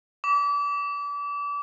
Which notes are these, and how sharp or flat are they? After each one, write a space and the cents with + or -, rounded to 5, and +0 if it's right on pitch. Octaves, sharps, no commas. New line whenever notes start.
D6 -30